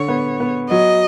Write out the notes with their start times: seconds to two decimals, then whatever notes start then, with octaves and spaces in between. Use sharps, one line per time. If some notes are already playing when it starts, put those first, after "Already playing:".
Already playing: D3 C#5
0.08 B3
0.40 B3
0.70 F#3 D#5